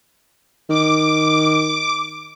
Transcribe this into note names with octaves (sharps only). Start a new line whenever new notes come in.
D#3 D6